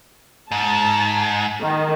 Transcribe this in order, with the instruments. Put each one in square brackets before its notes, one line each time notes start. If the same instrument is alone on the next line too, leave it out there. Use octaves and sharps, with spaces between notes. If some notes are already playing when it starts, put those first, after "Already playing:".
[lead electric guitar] G#2 [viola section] A5
[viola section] D#3